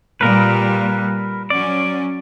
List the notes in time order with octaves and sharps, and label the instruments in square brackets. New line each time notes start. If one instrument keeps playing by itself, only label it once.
[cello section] A#2 G3 [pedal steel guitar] A#4 B4
[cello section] F#3 C#4 [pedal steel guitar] D5